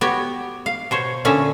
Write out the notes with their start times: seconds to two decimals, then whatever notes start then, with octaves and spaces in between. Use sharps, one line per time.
0.01 B3 F#4 G4 C#5
0.66 F5
0.91 B2 C5 C#5
1.25 A#2 D3 C#4 C#5 E5